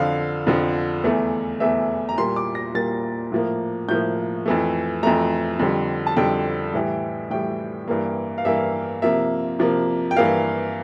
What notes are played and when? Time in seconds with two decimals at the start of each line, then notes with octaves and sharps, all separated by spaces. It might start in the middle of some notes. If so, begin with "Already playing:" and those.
Already playing: F2 D3 F3 F5
0.47 F2 D3 F3
1.04 E2 E3 A3
1.60 E2 E3 A3 E5
2.09 A#5
2.18 A#2 G3 A#3 C6
2.36 D6
2.55 A#6
2.75 A#2 G3 A#3 A6
3.32 A2 F3 A#3
3.89 A2 F3 A#3 G6
4.46 F2 E3 A3
5.03 F2 E3 A3 A#5
5.59 F2 D3 G3
6.07 A5
6.17 F2 D3 G3 G5
6.74 A2 E3 G3
7.31 A2 E3 G3 G5
7.88 G2 E3 A#3
8.38 F5
8.45 G2 E3 A#3 E5
9.02 C3 F3 A#3 E5
9.59 C3 F3 A#3
10.11 G5
10.16 G2 E3 A#3 F5